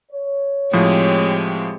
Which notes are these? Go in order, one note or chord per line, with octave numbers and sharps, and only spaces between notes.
C#5
A2 F3 G#3 C4 G4